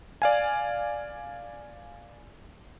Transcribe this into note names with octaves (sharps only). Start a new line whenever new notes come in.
D5 F5 G#5